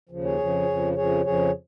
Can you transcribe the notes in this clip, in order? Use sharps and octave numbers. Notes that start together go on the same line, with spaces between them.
D#2 C#3 F3
G#4 C#5
F2 C#3 F3
F2 C#3 F3
F2 C#3 F3 G#4 C#5
F2 C#3 F3 G#4 C#5